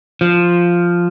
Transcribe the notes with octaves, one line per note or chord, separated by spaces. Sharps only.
F3